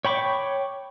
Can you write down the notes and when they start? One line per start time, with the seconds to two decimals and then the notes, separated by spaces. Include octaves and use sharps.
0.05 C#5 G5 B5 C#6 D6